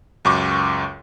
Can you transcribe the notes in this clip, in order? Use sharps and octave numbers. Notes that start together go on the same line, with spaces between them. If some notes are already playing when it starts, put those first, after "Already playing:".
C#2 F#2 C#6 D6